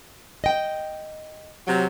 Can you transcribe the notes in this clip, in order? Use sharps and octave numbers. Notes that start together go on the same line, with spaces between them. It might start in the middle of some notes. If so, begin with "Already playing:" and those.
D#5 G5
C3 F#3